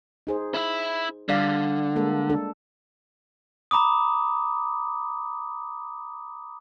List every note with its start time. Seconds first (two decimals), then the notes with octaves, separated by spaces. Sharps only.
0.27 D#4 G#4 C5
0.54 E4 E5
1.29 D3 G3 D5 F5
1.96 G#3 A#3 A4
2.30 D4 A4
3.71 A#5 B5 D6 D#6